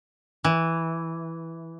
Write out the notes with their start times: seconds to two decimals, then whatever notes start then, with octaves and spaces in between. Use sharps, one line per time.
0.44 E3